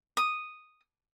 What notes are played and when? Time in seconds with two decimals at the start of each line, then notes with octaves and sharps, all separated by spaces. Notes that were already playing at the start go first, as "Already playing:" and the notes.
0.17 D#6